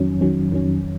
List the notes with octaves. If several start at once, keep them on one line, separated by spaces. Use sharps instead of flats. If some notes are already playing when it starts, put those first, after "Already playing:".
Already playing: F2 D#3 F#3 C#4
F2 D#3 F#3 C#4
F2 D#3 F#3 C#4